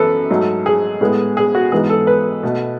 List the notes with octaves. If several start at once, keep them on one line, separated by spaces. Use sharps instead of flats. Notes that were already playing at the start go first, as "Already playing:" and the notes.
Already playing: F#2 E3 B3 A4 B4
G#2 F#3 A3
G#4
A2 G#3 B3
G#4
F#4
G#2 E3 G#3 B3 G#4
A4
B4
B2 A3